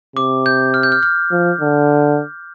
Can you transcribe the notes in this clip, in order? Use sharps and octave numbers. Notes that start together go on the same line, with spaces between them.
C3 D6
G6
F6
G6
F6
F6
F3
D3